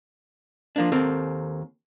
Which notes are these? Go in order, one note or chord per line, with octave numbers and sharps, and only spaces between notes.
F3 A#3 D4
D#2 C4 A4 A#4